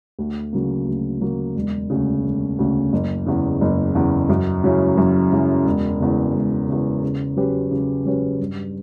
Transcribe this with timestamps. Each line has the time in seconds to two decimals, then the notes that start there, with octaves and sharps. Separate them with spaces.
0.18 D2
0.53 C#3 F#3 A#3
0.87 D2
1.21 C#3 F#3 A#3
1.55 E1
1.90 D2 C#3
2.24 E1
2.59 D2 C#3
2.93 F#1
3.26 E2 C#3
3.61 F#1
3.95 E2 C#3
4.29 F#2
4.64 C#3 F#3 C#4 E4
4.97 F#2
5.32 C#3 F#3 C#4 E4
5.65 E1
6.00 E2 C#3
6.34 E1
6.68 E2 C#3
7.03 C#3
7.36 F#3 C#4 G4 B4
7.71 C#3
8.05 F#3 C#4 G4 B4
8.39 G2